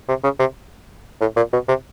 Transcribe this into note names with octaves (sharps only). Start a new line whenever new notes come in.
C3
C#3
C3
A2
A#2
B2
C3